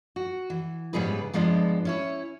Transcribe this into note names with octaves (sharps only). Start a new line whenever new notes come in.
F#4
E3
G#2 C#3 G3 B3 G#4 B4
G2 F3 G#3 B3 D4
C#4 E4 C#5